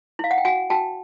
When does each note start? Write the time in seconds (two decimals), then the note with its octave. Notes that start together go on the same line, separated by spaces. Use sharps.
0.19 E4 F5
0.31 F#5
0.38 G5
0.45 F#4 F#5 G#5
0.70 F#4 G5 A5